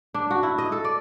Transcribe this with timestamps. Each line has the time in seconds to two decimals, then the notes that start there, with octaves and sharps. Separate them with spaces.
0.14 D4
0.31 F#4
0.43 E4
0.58 D#5
0.72 A4
0.85 D5